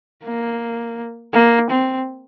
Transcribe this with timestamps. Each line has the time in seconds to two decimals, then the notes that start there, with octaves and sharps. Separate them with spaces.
0.23 A#3
1.33 A#3
1.70 C4